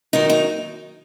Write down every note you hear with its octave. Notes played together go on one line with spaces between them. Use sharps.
D#2 D#3 F#3 D#4
D#4